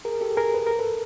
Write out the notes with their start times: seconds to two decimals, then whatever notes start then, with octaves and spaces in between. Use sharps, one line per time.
0.05 G#4 A#4
0.21 G4 A4
0.37 G#4 A#4
0.54 B4
0.67 A#4
0.79 A4 B4